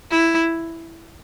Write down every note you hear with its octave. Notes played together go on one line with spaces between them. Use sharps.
E4